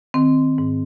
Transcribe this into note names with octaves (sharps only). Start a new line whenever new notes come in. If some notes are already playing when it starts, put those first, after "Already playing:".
D#3 C4
G#2